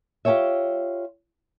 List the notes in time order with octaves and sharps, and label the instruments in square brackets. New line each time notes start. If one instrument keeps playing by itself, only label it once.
[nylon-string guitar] F4 G4 G#4 C5 C#5 E5